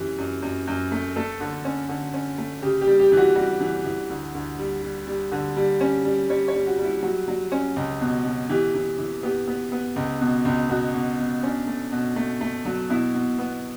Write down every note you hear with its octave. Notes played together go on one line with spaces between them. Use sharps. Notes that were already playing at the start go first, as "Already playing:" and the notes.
Already playing: F#2 E3 G4
F#2
F#2
F#2
A3
A3 A4
D3
C#4
D3
C#4
A3
C#3 G4
G4
G3
G4
E3
F#4
G3 F#4
E3
E3
D2
D2
G3
G3
G3
D3
G3
C#4
G3
G3 C#5
C#5
G3
F#4
G3
E4
F#3 F#4
F#3
C#4
C#2
B2
B2
E3 G4
E3
E3
B3 G4
B3
B3
C#2
B2
C#2
B2 F#4
B2
B2
C#4 D4
A3
B2
A3
A3
F#3
B2 E4
B2
B3